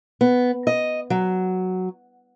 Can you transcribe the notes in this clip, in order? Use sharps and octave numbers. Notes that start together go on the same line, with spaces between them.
B3
D#5
F#3